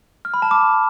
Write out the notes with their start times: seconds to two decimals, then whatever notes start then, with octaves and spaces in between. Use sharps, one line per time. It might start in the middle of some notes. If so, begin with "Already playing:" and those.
0.25 F6
0.34 B5
0.42 A5
0.51 D6